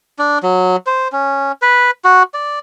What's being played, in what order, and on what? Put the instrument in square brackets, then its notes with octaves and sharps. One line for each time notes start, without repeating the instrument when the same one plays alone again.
[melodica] D4
F#3
C5
C#4
B4
F#4
D5